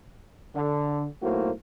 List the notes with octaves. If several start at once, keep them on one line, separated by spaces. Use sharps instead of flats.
D3
B1 A2 A#3 F#4 C5